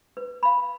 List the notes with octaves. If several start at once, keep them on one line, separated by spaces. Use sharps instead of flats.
B4
F5 B5